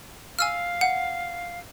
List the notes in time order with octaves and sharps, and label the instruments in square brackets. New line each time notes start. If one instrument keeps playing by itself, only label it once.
[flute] F5 [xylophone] G#5 E6 F6
[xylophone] F#5